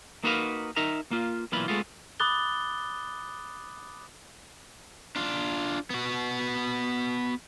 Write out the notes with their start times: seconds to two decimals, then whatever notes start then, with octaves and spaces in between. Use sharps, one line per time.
0.24 A#3 D#4 F#4 A#4 B4 F5
0.76 D#4 A#4 D#5 E5 A#5
1.11 A#3 F4
1.52 B1 A#2 E3 A#3 F4 B5
1.68 G#3 A3 B3 F4
2.20 B5 D6 D#6 F#6 A6 G7
5.16 D4 F4
5.90 B3 F#4